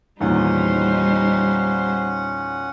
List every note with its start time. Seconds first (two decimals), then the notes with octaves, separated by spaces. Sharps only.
0.21 E2 A#2 D#3 G3 C#4 D#4 C5 F#5